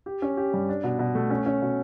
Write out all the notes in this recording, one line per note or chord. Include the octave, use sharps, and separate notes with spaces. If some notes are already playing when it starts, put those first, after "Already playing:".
G4
C#4
G4
G2
D4
B2
B2
A3
C#4
C#4
B2